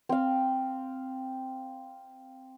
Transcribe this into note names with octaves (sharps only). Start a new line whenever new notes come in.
C4 F5